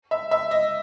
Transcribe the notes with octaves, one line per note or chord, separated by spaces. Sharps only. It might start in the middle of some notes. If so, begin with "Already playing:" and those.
E5
E5
D#5